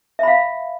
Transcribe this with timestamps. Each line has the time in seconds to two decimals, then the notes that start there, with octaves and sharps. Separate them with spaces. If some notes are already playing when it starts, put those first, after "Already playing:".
0.19 E5
0.23 B5
0.28 F5